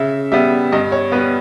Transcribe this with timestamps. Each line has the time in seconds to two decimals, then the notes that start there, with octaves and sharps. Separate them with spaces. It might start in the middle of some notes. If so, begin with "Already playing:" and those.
Already playing: C#3 E5
0.32 G3 B3 E5
0.72 G2 D#5
0.92 C#5
1.12 B3 B4
1.15 G3